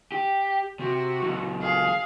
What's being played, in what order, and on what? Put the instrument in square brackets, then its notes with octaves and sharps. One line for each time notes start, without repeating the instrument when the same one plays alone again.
[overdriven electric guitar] G4
[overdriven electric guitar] C3 [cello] F#4
[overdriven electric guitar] C#2 F#3
[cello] G#4 F5